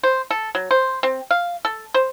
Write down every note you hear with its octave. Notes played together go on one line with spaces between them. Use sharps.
C5
A4
F#3
C5
C4
F5
A4
C5